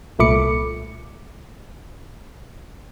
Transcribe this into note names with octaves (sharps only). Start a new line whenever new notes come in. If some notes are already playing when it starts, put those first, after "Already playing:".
C2 A#2 A3 B5 D6 C#7